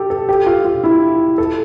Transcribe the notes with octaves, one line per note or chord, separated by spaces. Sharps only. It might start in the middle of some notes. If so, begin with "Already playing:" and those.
Already playing: G4 A4
A4
G4
F4
F4
E4
A4